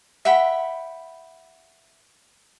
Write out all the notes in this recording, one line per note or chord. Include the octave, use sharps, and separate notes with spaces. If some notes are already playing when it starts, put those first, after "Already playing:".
E5 F#5 G5 B5